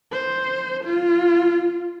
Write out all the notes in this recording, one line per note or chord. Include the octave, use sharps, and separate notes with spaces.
C5
F4